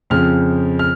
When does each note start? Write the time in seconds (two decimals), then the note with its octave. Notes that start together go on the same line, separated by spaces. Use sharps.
0.10 F2 C#3 F3 F6
0.79 F6